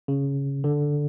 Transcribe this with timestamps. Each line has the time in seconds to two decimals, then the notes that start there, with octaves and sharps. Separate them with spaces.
0.08 C#3
0.64 D3